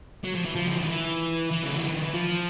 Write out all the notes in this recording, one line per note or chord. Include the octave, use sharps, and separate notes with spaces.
F#3
F3
E3
F3
D3
D#3
E3
E3
C#3
D3
D#3
E3
F3